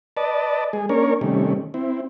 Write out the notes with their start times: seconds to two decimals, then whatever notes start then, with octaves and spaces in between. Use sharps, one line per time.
0.17 B4 D5 D#5 A5
0.73 G#3 G#4
0.89 A#3 C#4 D4 A#4 C#5
1.21 C3 D#3 G3 A3 C#4
1.74 C4 E4